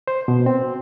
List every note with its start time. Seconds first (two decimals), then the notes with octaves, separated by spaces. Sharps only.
0.08 C5
0.28 B2
0.46 C4